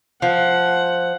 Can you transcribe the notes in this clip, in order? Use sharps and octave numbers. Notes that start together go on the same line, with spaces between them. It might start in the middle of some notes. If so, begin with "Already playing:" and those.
F3 F#5